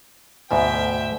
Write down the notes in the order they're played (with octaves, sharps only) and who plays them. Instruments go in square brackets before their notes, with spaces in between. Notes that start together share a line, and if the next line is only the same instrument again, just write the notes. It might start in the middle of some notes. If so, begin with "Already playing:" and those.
[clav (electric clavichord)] D2 G#2 B2 [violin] E5 G5